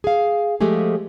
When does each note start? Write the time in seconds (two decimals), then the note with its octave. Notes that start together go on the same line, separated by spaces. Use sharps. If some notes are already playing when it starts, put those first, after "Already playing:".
0.04 G#4 F5
0.61 F3 G#3 A3 G4 G#4